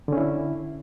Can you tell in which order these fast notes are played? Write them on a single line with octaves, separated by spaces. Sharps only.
D3 C#4 E4